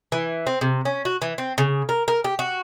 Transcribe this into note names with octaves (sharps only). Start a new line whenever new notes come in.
E3
C4
C3
C#4
F#4
E3
C4
C#3
A#4
A#4
G4
F#4